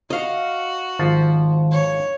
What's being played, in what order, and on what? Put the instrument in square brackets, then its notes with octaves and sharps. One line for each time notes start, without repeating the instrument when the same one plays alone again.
[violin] F#4 [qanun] D#5 F5
[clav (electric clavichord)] G#1 F3 F4 [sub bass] D#3
[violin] C#5